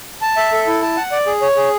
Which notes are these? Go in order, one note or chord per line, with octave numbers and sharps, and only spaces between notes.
A5
E5
A4
E4
A5
F#5
D5
G#4
C#5
G#4